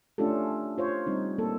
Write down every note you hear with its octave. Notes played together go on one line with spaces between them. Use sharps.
A3 C#4 D4 F4 G4 A4
F4 C5 C#5
G3 C4 D#4
A#3 A4